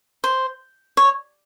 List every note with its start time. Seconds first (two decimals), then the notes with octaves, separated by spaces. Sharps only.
0.24 C5
0.97 C#5